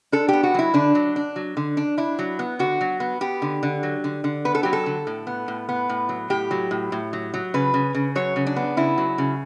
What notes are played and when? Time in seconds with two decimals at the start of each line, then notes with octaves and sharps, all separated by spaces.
0.12 D4 A4
0.28 B3 G4
0.43 F#4
0.54 F#3 E4
0.74 D3 D4
0.95 F#3
1.16 D4
1.36 F#3
1.57 D3
1.77 D4
1.98 D4 E4
2.19 F#3
2.39 B3
2.59 D3 F#4
2.81 F#3
3.00 B3
3.21 B3 G4
3.42 D3
3.63 D3
3.83 F#3
4.04 D3
4.24 D3
4.45 B3 B4
4.55 A4
4.63 F#3 G4
4.73 A4
4.86 D3
5.07 A2
5.27 B3
5.48 A2
5.69 B3
5.89 A2
6.09 F#3
6.30 A2 G4
6.51 F#3
6.71 A2
6.92 A2
7.13 F#3
7.34 F#3
7.54 C#3 B4
7.74 C#3
7.94 C#3
8.15 F#3 C#5
8.36 C#3
8.47 D4
8.56 B3
8.77 C#3 E4
8.98 F#3
9.18 C#3